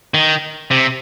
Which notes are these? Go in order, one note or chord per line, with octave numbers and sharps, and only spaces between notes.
D#3
C3